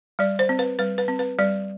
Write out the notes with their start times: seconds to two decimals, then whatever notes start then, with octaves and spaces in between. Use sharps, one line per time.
0.19 G3 D5
0.39 C5
0.49 C4
0.59 B4
0.79 G3 B4
0.98 B4
1.08 C4
1.19 B4
1.38 G3 D5